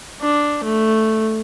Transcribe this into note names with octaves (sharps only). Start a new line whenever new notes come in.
D4
A3